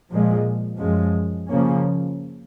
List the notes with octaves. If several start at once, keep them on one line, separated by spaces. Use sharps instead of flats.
A#2 F3 G#3
F#2 F3 G#3
C#3 F3 A#3 C#4